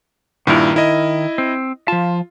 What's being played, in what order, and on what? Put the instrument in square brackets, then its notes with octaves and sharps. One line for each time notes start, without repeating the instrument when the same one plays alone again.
[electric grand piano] G2 A#2 E4 [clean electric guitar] D#3 A#4
[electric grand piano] E4 D#5
[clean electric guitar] C4
[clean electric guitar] F3 A5 [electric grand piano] F4